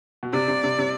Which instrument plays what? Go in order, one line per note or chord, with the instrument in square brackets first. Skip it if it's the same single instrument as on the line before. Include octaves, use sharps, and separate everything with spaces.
[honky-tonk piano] B2
[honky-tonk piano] C3 [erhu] D5
[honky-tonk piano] C3
C3
C3